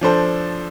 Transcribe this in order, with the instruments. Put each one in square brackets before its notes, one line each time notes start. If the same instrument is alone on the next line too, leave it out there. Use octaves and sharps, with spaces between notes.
[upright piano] F3 D4 A4 C5